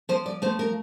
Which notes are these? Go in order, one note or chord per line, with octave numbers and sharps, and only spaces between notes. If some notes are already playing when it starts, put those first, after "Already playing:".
F3 C5
D5
A3 C5
A#4